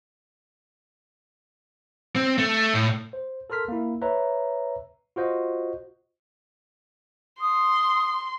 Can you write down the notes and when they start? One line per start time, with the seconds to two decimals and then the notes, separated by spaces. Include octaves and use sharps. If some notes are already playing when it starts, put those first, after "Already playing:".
2.15 C4
2.38 A3
2.74 A2
3.13 C5
3.50 A4 A#4 C6 F6 B6
3.68 A#3 E4
4.02 B4 C#5 E5 A#5
5.16 F4 F#4 C5 D#5
7.40 C6 D#6